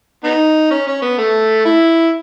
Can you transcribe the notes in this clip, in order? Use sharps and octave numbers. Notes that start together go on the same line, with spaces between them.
B3 D#4
C#4
C#4
B3
A3
E4